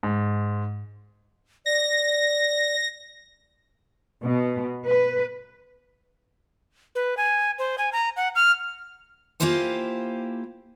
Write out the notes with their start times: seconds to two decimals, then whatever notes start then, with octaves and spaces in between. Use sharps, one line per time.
0.03 G#2
1.66 D5 A#6
4.22 B2
4.85 B4
6.95 B4
7.17 G#5
7.59 C5
7.78 G#5
7.93 A#5
8.17 F#5
8.35 F6
9.40 A#3 E4 F4 G4 C5 G#5